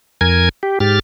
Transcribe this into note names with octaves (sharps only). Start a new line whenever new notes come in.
F2 A#4 G#5 G#6
G4
G#2 G4 F6 A6